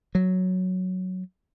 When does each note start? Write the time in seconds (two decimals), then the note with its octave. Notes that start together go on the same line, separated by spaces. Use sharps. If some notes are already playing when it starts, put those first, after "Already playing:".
0.15 F#3